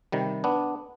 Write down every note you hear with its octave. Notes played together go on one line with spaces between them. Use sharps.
C3 D#3 G3
B3 D4